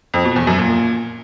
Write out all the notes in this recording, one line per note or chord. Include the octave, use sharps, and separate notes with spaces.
F2
B2
E2
F#2
A#2